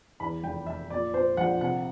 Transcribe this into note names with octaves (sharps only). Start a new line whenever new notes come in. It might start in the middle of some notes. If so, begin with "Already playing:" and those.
E2 B5
F1 G5
F1 E5
A#2 D5
A#2 C5
A#1 F#5
C3 F#5